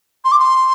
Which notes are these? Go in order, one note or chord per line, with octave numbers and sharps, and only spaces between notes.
C6
D6
C6